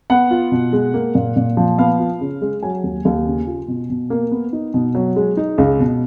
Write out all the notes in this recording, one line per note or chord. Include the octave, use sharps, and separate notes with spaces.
B3 F#5
F4
B2
G#3
A#3
A#2
A#2
F3
B3 F5
F4
C#3
G#3
F#3 G#5
D#2
D#2
C#3
F4
B2
B2
A#3
B3
D#4
B2
F#3
G#3
D#4
C#2
B2